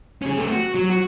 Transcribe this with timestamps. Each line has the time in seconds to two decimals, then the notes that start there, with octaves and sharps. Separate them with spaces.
0.22 C#4 G#4
0.37 A3 C4
0.52 F#4
0.75 F#3
0.90 F#4